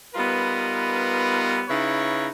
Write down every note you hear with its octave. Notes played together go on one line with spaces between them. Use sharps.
G3 B3 D#4 F4 A#4 B4
C#3 D#4 E4 B4 C#5 A#5